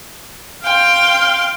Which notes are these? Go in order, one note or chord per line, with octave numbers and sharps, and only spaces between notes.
F5 G5 C6